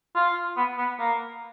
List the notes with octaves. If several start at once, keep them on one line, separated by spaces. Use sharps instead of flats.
F4
B3
B3
A#3